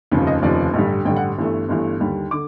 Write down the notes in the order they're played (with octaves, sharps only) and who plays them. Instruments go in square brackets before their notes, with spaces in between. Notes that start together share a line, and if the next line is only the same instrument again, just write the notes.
[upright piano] F1 D#2 C#3 F3
D#5
F1 D#2 C#3 F3 D5
A1 G2 D3 G3
A1 G2 D3 G3 G5
F#5
G1 G2 E3 A3
G1 G2 E3 A3
D#2 D3 G3
D3 D6